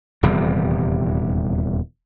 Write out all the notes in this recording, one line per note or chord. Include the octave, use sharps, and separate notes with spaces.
D#1 E2 C3 G3